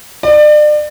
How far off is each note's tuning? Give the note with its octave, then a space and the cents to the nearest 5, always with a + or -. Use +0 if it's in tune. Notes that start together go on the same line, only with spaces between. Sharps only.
D5 +35